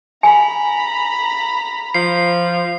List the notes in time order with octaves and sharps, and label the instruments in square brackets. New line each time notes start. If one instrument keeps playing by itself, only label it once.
[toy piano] G#5 [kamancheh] A#5 B5
[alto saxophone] F3 [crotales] C7